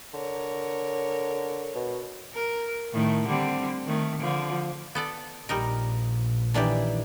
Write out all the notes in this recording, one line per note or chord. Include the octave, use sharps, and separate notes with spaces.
D3 A#4 C#5
B2
A#4
A2 D#3 A3
D3 G3 C4
D#3 A3
D3 F3
B3 A4 D5
A#1 G3 D#4 A#4
D#3 E3 D4 G4 A5